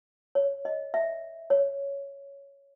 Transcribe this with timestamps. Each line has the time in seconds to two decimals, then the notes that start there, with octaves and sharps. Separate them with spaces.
0.35 C#5
0.65 D#5
0.94 E5
1.50 C#5